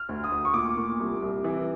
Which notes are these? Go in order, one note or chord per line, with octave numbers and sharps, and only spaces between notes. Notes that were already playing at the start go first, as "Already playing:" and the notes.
Already playing: F6
D2
D#6
D2
C#6
A#2 D6
A#2
C2
C2
E3